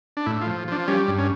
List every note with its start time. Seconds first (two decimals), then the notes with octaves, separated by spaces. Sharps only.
0.17 D4
0.26 A2 E4
0.41 F4
0.47 F3
0.68 F3 D4
0.88 G3 C#4
1.08 G2
1.18 C#4